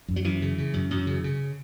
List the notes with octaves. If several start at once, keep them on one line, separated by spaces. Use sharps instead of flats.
F#2
F#3
F#2 E3
C#3
C#3
F#2
F#2
C#3
C#3